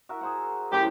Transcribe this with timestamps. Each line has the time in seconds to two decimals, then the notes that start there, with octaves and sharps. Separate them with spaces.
0.09 F#4 A#4 E5
0.21 G#4 C5 F#5
0.72 F#2 A2 G4 C5